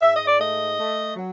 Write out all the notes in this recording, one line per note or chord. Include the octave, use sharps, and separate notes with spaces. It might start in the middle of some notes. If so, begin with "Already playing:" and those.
G#2 E5
D#5
D5
A3 D#5
A3
F#3